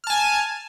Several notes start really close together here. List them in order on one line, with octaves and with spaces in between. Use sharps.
F6 A5 G#5